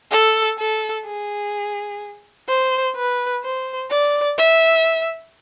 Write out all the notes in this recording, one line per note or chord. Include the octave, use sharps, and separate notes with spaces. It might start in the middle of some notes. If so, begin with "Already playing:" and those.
A4
A4
G#4
C5
B4
C5
D5
E5